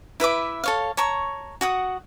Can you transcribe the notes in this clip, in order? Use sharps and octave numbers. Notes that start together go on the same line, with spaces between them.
E4 B4 E5 D6
A4 C#5 F5
C#5 A5 A#5 C#6
F#4 F#5 D#6